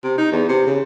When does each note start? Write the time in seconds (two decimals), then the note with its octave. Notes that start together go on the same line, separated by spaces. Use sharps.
0.04 C3
0.18 D#4
0.32 E2
0.49 C3
0.67 C#3